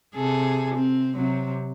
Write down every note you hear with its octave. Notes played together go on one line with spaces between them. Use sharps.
C3 G#4 A4
C4
C3 F#3 C4